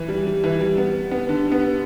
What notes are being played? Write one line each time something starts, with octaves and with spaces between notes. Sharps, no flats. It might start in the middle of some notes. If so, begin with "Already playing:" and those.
Already playing: E3
G3
G3
E3
G3
B3
B3
D3
B3